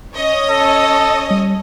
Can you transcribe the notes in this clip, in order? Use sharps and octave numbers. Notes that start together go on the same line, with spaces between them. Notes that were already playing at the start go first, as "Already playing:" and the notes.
C#4 C#5 D#5
A4
G3